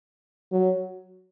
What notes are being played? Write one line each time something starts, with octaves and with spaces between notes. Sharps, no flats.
F#3